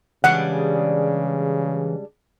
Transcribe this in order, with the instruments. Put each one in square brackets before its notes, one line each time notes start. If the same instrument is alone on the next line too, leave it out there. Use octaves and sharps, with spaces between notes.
[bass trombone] C#3 [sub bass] E3 [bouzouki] G3 G#3 D4 [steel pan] F#5